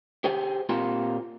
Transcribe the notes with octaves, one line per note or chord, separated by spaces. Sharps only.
G4 G#4 C5 G5
A#2 C4 F4 G4 A#4 C6